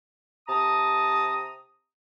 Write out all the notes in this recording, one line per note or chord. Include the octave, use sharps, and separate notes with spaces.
C3 A5 A#5 D#6